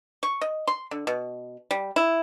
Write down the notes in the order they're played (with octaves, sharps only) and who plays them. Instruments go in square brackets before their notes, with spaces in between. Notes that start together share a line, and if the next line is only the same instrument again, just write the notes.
[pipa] C#6
D#5
C6
D3
B2
G3
E4